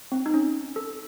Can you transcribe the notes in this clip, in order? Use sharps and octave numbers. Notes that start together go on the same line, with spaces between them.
C4
D#4
C#4
A4